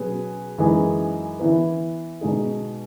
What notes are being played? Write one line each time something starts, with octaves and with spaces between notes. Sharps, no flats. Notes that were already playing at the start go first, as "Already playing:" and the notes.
Already playing: B2 F#3 C#4 G#4 B4
F#2 E3 G#3 D#4 G#4
E3 B3 E4 B4
B2 G#3 D#4 G#4